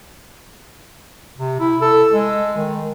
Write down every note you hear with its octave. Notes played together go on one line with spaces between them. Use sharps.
C3
E4
A4
G#3
D#3